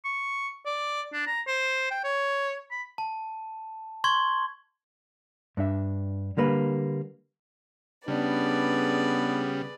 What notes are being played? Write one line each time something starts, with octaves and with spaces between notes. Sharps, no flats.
C#6
D5
D4
A#5
C5
G5
C#5
B5
A5
C6 C#6 G#6
G2 D4 E5
D3 G3 A#3 B4
C#3 G3 B3 D4 G#4 B4 D5